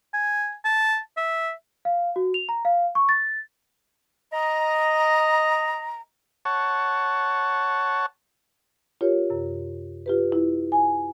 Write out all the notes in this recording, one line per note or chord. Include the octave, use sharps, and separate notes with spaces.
G#5
A5
E5
F5
F#4
F7
A#5
F5
C#6
A6
D#5 A#5
C#5 F#5 A5
F4 G4 A#4 C#5
F#2 C3
F4 G4 B4
E4
G#5